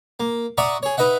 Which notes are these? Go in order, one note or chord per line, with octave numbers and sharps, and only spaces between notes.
A#3
D5 E5 F#5 A#5 C#6 D#6
G#4 C#5
D#4 B4 D#5 E5 F#5